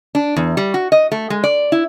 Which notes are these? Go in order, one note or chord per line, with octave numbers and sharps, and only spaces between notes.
D4
E2
G3
F#4
D#5
A3
G#3
D5
E4